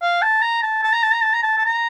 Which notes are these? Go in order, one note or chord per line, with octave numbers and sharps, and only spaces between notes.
F5
A5
A#5
A5
A5
A#5
A5
A#5
A5
A#5
A5
A5
A#5